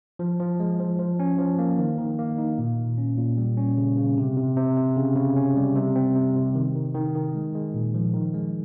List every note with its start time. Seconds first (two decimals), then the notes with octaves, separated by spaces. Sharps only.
0.19 F3
0.40 F3
0.60 G#3
0.80 F3
0.99 F3
1.19 C#4
1.39 F3
1.59 A#3
1.79 D#3
1.99 D#3
2.19 A#3
2.38 D#4
2.58 A#2
2.78 A#2
2.98 C#4
3.18 A#2
3.38 G3
3.57 C#4
3.78 C#3
3.97 C#3
4.18 C3
4.37 C3
4.57 C3
4.77 C3
4.96 C#3
5.16 C#3
5.36 C#4
5.56 G3
5.76 C3
5.96 C4
6.15 C3
6.36 C3
6.55 D#3
6.76 D#3
6.95 D#3
7.15 D#3
7.35 G#3
7.55 G#3
7.74 A#2
7.94 F3
8.14 D#3
8.34 G#3